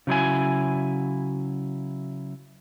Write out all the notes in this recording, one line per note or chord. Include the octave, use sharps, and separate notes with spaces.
C#3 F#3 E4 G#5